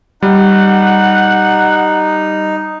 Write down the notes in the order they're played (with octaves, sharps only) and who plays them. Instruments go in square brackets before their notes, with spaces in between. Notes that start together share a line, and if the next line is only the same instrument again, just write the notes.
[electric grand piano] G3 [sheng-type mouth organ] D#4 [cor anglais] F#5